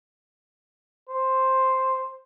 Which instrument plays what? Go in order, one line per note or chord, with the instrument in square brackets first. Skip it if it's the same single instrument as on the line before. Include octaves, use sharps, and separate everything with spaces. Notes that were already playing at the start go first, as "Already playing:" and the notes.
[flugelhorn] C5